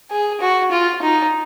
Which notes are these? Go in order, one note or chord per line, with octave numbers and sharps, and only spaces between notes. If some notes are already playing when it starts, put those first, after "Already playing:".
G#4
F#4
F4
D#4